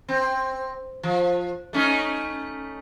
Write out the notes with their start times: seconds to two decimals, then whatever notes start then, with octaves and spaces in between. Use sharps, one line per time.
0.09 C4
1.03 F3
1.73 A3 C#4 D#4